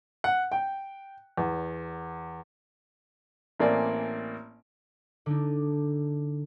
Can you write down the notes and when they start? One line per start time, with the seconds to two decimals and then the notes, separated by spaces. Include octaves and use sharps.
0.24 F#5
0.52 G5
1.37 E2
3.59 A1 A#3 C4 D5 G#5
5.26 D3 D4 D#4